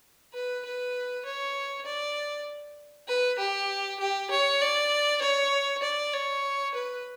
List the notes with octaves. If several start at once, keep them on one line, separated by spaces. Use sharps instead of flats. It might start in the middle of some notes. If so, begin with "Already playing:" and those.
B4
B4
C#5
D5
B4
G4
G4
C#5
D5
C#5
D5
C#5
B4